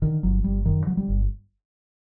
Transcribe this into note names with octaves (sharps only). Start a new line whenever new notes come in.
D3 D#3
G1 F#3
G1 G3
F#2 D#3
D3 F#3
G3
G1